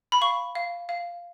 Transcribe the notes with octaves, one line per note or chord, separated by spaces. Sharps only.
B5
F5 C#6
F5
F5